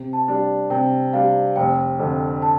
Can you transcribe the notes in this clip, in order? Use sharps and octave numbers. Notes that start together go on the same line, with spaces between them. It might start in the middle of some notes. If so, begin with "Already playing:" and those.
Already playing: C3
A5
G3 D4
C3 G5
G3 D4 F5
F1 G5
F2 D3
A5